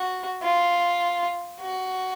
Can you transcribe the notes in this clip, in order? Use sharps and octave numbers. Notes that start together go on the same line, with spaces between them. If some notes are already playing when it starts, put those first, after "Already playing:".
Already playing: F#4
F4
F#4